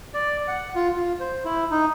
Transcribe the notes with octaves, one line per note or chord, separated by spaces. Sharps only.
D5
F#5
F4
F4
C5
E4
D#4